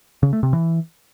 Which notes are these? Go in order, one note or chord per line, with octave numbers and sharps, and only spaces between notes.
C#3
A3
C3
E3